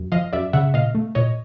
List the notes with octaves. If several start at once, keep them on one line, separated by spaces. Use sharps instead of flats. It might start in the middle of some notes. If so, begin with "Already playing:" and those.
Already playing: F#2
F3 D#5 F5
F#2 D5 E5
C#3 E5 F#5
A#2 D#5 F5
A3
A#2 C#5 D#5